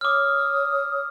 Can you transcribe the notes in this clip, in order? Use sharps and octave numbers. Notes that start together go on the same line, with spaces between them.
C#5 D6 D#6 F6